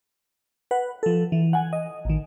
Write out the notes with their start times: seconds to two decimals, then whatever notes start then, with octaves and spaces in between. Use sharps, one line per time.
0.71 B4 F#5
1.03 F3 A4
1.32 E3
1.53 F#5 G#5
1.73 D#5
2.05 A1 D#3